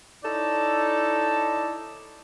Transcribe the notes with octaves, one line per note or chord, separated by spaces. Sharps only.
D#4 E4 A4 C#5 D5